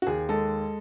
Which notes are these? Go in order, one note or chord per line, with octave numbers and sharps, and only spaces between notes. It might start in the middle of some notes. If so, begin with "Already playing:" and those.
F#4
D#2 G#4
G#3 A4